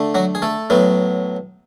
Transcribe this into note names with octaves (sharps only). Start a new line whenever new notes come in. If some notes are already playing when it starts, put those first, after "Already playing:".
Already playing: D3 A3
F#3 F#4
G#4
A3 A4
A2 F#3 B3